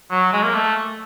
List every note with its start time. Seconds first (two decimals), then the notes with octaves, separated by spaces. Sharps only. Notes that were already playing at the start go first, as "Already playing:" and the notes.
0.11 F#3
0.33 G#3
0.44 A#3
0.55 A3